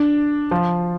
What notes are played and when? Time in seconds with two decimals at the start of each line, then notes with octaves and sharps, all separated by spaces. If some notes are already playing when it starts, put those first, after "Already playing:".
Already playing: D4
0.51 F3